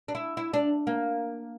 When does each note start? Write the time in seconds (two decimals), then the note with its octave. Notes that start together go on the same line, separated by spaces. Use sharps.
0.08 D4
0.15 E4
0.37 E4
0.53 D4
0.87 A#3